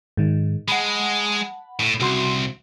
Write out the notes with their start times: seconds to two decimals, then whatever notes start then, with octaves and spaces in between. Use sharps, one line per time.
0.17 G#2 D#3
0.68 G#3 F#5 A5 B5
1.80 A2
2.00 C2 C#3 F#4 C6